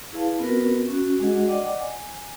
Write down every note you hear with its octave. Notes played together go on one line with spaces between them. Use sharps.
E4 G#4 B4 F5 A5
B3 C4 F4 F#4 A#4 B4
C#4 F#4
G#3 D4 F#4 G#4 D#5 F#5
D5 D#5 F#5 G5 D6
G#5